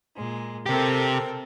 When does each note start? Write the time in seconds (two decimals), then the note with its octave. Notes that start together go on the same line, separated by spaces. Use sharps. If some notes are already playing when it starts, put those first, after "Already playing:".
0.16 A#2 G#3
0.66 C3 C4 G4 A4 A#4